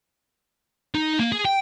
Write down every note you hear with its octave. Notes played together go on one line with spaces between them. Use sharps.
D#4
A#3
G#4
G5